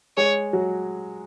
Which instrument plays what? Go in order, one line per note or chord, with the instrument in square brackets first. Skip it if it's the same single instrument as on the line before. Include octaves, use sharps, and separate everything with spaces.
[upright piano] G#3 G#4 [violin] C#5
[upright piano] F#3 F#4